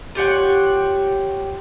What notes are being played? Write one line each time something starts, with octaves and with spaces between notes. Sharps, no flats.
F4 G4 C#5 F#5